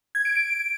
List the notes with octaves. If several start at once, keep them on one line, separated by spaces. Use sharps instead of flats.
G#6
D7
D7